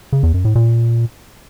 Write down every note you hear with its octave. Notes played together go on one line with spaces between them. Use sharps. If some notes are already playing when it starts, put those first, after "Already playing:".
C#3
E2
F#2
A2
A#2